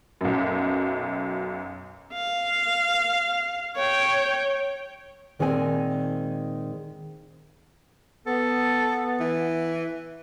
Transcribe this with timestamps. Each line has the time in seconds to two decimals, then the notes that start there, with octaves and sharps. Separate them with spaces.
0.21 B1 F#2
2.13 F5
3.76 C#5 G5
5.39 A#2 D#3 G#3 C4 G#5
8.26 B3 A4
9.20 E3